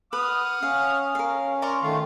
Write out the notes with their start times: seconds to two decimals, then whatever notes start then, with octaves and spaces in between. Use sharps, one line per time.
0.13 B4 F#5 D#6 F6
0.63 C#4 F5
1.15 A#4 F5
1.62 A#4 D5 C6 C#6
1.83 D#3 A3 F4